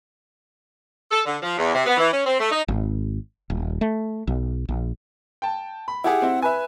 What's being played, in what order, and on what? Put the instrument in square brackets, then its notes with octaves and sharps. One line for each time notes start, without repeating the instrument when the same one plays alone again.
[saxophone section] A4
D3
F3
E2
C3
B3
E3
C#4
C4
A3
D#4
[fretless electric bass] G#1
D#1
A3
B1
A#1
[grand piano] G5 A5
B5
[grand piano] E4 G4 G#4 [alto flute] F#5
[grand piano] C4 E4
[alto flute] B4 [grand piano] E5 G#5